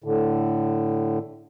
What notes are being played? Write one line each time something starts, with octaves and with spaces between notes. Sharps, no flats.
A2 D3